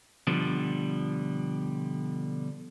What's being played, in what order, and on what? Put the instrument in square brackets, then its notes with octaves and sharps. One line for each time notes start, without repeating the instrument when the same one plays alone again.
[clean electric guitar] B2 D3 F3 G3